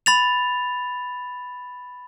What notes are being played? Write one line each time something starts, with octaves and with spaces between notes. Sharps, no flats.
B5 A6 F7